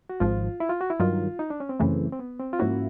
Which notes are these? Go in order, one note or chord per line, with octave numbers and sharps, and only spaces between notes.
F#4
G#1 G#2 F3 F4
E4
F4
F#4
E4
G2 D#3 F#3 F4
D#4
D4
C#4
C4
F#2 C#3 E3 A3
C4
B3
C4
F4
G#2 F3 A#3 C#4 E4 F#4